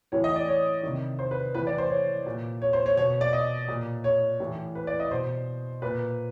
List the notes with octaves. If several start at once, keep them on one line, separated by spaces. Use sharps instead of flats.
A2 E3 C#5
D#5
D5
C#5
C3 D#3
C5
B4
A2 E3 B4
D5
C5
C#5
A#2
C#5
C5
C#5
B2 C#5
D5
D#5
A#2
C#5
A2 E3
B4
D5
D#5
B2 C5
A#2 B4